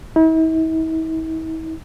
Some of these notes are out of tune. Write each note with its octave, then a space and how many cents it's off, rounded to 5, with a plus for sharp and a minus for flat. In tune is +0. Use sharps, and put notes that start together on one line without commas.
E4 -45